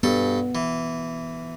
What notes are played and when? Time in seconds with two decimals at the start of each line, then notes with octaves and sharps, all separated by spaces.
0.03 G2 B3 A4
0.55 E3